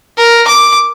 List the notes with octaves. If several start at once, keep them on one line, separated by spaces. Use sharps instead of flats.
A#4
D6